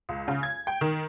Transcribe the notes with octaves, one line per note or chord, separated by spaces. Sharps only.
C#2
C#3
G#6
G5
D#3